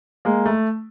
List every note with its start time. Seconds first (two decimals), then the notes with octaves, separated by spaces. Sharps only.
0.25 G#3 A#3
0.46 A3